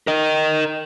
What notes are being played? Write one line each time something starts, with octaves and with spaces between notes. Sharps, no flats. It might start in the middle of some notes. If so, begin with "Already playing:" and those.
A#4 D#5